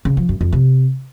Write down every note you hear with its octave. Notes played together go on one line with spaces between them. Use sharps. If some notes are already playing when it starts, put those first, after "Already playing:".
C#3
F3
F#2
F2
C3